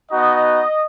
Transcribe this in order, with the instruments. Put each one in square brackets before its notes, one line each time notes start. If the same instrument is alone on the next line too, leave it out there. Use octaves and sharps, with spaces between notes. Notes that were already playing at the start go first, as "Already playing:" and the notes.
[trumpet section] B3 D#4 F#4 D#5